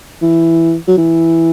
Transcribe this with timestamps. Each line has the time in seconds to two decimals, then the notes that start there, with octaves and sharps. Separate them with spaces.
0.22 E3
0.88 F#3
0.97 E3